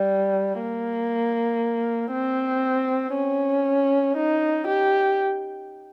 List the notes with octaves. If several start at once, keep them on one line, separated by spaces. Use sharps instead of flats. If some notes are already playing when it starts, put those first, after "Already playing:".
Already playing: G3
A#3
C4
C#4
D#4
G4